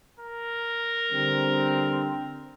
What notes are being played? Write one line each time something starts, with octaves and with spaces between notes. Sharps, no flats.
A#4
D3 G3 C4